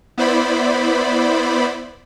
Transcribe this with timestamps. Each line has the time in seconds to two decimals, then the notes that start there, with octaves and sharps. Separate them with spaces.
0.18 B3 E4 C5 D5 B5